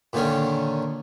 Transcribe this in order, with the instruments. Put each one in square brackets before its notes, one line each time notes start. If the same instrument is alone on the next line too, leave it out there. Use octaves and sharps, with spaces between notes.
[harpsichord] A#2 D3 D#3 C#4